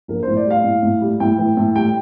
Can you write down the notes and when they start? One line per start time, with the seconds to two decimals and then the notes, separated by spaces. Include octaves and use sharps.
0.08 A#1 A#4
0.23 A2 C5
0.37 D5
0.46 G3 F5
0.64 A2
0.83 A2
1.01 G3
1.20 A2 G5
1.38 E3
1.57 A2
1.76 G3 G5